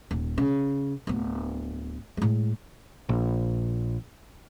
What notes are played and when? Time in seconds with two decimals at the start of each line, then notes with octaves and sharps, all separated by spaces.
0.11 D#1
0.38 C#3
1.07 D1 B3
2.17 A2 G#3
3.09 A#1